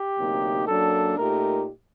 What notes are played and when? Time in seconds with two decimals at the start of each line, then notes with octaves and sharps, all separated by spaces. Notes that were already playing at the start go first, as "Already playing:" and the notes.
Already playing: G4
0.16 D2 C3 F#3 A#3 D#4
0.67 F#2 F#3 A#3 D4 A4
1.18 A#2 A3 D#4 G4 A#4